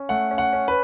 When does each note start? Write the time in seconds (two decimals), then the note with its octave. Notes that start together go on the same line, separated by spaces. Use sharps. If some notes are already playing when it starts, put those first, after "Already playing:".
Already playing: C#4
0.09 A3 F#5
0.31 C#4
0.38 F#5
0.53 C#4
0.68 B4